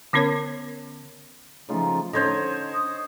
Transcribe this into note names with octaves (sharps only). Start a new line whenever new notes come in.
D3 B3 C#4 A#4 C#5 G#6
C#3 F3 A3 D#4 F4
D3 C#4 D#4 C5 C#5 D#5
D#6